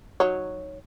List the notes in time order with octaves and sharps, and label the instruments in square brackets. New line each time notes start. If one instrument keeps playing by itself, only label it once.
[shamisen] F#3 D#4 C#5